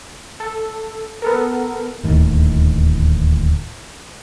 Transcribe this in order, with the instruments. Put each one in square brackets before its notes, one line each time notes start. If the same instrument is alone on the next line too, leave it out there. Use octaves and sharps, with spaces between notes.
[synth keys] A4
B3 A4 A#4
[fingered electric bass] D1 D#2 A2